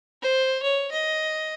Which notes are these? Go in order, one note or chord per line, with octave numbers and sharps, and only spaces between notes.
C5
C#5
D#5